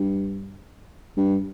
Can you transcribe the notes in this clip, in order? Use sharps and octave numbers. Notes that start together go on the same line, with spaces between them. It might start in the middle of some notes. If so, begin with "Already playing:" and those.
Already playing: G2
G2